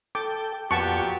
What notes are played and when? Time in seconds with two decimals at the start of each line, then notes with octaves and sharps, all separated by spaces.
0.15 A4 G5 D6
0.71 F2 A#2 B3 F#4 G4 A5 C#6